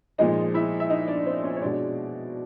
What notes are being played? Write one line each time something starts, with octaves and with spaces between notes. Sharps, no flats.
A#2 F3 G#3 D#4 D#5
E4 E5
E5
D#4 D#5
D4 D5
C4 C5
C#4 C#5
C#5
B2 G#3 D4 D5